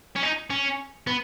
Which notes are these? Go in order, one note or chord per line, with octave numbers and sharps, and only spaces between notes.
C#4
D#4
C#4
B3